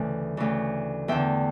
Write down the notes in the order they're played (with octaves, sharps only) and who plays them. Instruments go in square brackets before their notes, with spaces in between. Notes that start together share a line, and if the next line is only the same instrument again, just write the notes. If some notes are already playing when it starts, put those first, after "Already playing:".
Already playing: [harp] D2 C#3 E3
D2 C#3 E3
E2 D3 E5 G5